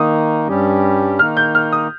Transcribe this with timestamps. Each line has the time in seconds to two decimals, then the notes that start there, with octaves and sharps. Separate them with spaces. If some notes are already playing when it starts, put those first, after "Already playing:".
Already playing: D#3 A#3 D#4 D#6
0.48 G2 G3 C#4 G4
1.19 D#3 A#3 D#4 F6
1.37 G6
1.55 F6
1.72 D#6